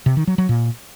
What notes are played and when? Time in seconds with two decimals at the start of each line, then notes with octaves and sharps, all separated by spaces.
0.06 C3
0.17 D#3
0.27 F#3
0.38 F#3
0.49 A#2